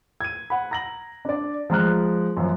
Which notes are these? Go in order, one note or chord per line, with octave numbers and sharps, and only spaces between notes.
G#6 D#7
F#5 B5
A#5 A#6 F#7
D4 D5
F3 G#3 A#5 F6 F#6
F#2 F3